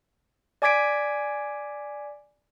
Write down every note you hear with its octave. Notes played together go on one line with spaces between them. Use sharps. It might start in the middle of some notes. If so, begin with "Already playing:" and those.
D5 G#5 D6 G#6 B6 D7